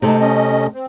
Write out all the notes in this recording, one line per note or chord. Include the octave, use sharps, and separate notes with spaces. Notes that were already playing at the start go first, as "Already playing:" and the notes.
C3 G#3 A3 D#4 A4
C#4 D#5
C4